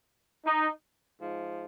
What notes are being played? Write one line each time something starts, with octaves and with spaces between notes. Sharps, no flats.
D#4
G#2 F3